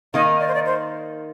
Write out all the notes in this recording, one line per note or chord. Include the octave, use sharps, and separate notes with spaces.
D#3 A#3 D#4 D#5
D5
C5
D5
C5